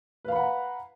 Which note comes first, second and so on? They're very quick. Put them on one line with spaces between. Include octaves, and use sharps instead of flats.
B4 F5 B5 F#5 A#5